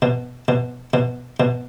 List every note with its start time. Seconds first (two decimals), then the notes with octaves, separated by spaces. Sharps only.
0.02 B2
0.48 B2
0.94 B2
1.40 B2